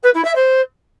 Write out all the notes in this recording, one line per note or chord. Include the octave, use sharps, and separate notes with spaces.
B4
E4
E5
C5